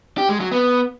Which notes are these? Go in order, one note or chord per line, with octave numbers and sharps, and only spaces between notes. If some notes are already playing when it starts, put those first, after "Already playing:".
G4
G#3
F#3
B3